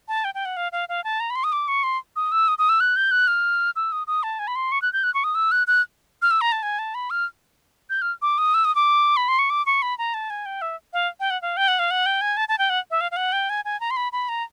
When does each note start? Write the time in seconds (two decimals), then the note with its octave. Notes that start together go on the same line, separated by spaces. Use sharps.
0.08 A5
0.24 G5
0.35 G5
0.45 F#5
0.57 F5
0.72 F5
0.89 F5
1.04 A5
1.20 A#5
1.30 B5
1.36 C6
1.44 D#6
1.52 D6
1.68 C#6
1.83 C6
2.16 D#6
2.32 E6
2.48 D#6
2.58 D#6
2.69 E6
2.80 F#6
2.96 G6
3.11 F#6
3.27 F6
3.76 E6
3.92 D#6
4.07 D#6
4.23 A5
4.39 G#5
4.47 B5
4.56 C6
4.72 C#6
4.82 F#6
4.93 G6
5.04 F#6
5.14 C#6
5.24 D#6
5.35 E6
5.52 F#6
5.67 F#6
6.22 F6
6.31 E6
6.41 A#5
6.52 A5
6.63 G#5
6.79 A5
6.95 B5
7.10 F6
7.90 G6
8.02 F6
8.22 D6
8.38 D#6
8.54 E6
8.65 D#6
8.75 D6
9.17 B5
9.28 C6
9.39 C#6
9.50 D6
9.66 C#6
9.82 B5
9.98 A#5
10.14 A5
10.30 G#5
10.46 G5
10.62 E5
10.93 F5
11.20 G5
11.30 F#5
11.42 F5
11.57 G5
11.68 F#5
11.79 F5
11.91 F#5
12.06 G5
12.21 G#5
12.37 A5
12.49 A5
12.58 G5
12.70 F#5
12.91 E5
13.01 F5
13.11 F5
13.17 F#5
13.32 G5
13.50 G#5
13.65 G#5
13.80 A#5
13.91 C6
13.97 B5
14.12 B5
14.29 A#5